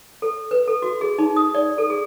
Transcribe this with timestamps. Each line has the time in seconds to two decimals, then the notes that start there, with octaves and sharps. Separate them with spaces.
0.22 A4
0.51 B4
0.68 A4
0.82 F#4
1.01 G#4
1.18 D#4
1.36 D#6
1.55 D5
1.78 A4
1.90 G#4